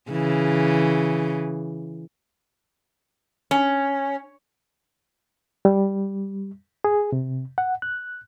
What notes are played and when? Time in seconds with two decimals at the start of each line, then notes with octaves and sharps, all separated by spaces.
0.11 C#3 E3
3.51 C#4
5.65 G3
6.84 G#4
7.12 C3
7.58 F#5
7.82 F#6